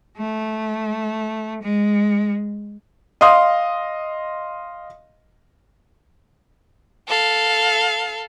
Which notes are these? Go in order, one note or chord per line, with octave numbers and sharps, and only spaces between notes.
A3
G#3
D#5 F5 C6 D#6
A4 F5